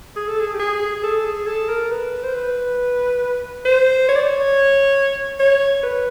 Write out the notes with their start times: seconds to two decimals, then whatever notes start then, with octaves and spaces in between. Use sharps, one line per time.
0.16 G#4
0.28 A4
0.40 G#4
0.54 G4
0.60 G#4
1.03 A4
1.25 G#4
1.47 A4
1.69 A#4
1.90 B4
2.23 C5
2.34 B4
3.65 C5
4.08 C#5
4.16 D5
4.23 C#5
5.39 C#5
5.83 B4